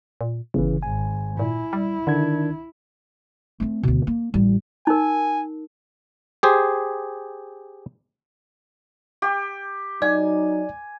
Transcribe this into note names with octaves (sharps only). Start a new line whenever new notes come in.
A#2
G1 C#3 E3
G#1 G#5
A#2 E4
G3
D3 D#3 D4 G#6
A3 C4
D2 B2
A#3
A1 G3
D#4 A#4 G#5
G4 G#4 C5
G4
F#3 D#4 D5 G#5